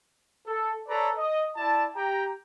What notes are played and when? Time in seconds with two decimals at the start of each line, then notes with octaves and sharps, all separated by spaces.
0.47 A4
0.88 A4 B4 C#5 D5 A#5
1.17 D#5
1.56 E4 D5 A5
1.95 G4 G5 A#5